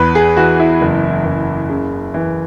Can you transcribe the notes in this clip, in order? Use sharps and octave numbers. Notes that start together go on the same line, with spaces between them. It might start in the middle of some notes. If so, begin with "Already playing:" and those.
Already playing: E2 B4
G#4
E3 F#4
E4
F#1
F#1
C#3
E3